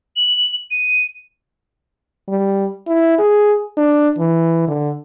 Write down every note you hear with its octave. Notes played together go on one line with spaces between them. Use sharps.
F#7
D#7
G3
E4
G#4
D4
E3
D3